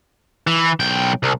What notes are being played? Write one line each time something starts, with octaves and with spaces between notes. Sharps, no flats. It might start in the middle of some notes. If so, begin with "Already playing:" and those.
E3
B1 G5
C2